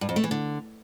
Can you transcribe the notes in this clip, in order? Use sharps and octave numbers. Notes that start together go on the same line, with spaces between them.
G2
F2
A3
E3
D3